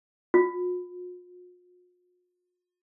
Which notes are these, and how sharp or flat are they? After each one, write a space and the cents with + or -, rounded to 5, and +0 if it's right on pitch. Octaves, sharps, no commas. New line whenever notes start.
F4 +45